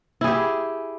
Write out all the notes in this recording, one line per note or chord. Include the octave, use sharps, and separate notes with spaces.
E4 G4 G#4